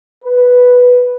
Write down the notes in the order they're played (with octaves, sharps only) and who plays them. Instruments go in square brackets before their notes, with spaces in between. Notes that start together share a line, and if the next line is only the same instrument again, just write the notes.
[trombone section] B4